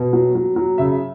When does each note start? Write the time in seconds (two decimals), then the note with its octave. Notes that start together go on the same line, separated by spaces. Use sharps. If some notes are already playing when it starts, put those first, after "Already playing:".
Already playing: B2
0.13 F#3
0.35 F#3
0.56 F#3
0.78 C#3 E5